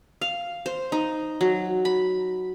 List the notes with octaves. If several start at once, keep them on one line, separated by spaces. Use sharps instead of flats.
F5
C5
D#4
F#3
B5